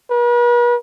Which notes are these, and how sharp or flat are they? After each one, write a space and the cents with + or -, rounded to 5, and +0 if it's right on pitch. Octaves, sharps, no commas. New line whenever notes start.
B4 -45